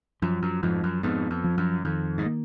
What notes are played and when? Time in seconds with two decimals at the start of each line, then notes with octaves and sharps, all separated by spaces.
0.22 F#2 F3
0.43 F#2
0.63 F2 G#2 F3
0.84 F#2
1.03 F2 G#2 B3
1.31 F2
1.44 F3
1.58 F#2
1.84 F2 D#3
2.18 G#2
2.25 A#3